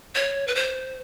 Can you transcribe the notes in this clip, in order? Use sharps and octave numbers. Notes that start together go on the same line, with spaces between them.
C#5
B4
C5